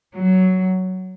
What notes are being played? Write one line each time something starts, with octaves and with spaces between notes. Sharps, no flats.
F#3